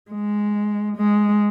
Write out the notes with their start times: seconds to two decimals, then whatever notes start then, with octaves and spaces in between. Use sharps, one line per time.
0.11 G#3
0.97 G#3